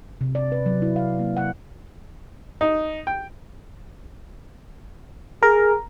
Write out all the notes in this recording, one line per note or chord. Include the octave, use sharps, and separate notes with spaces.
C3
D5
B4
F#3
E4
F5
A#3
F#5
D#4
G5
G#4 A#4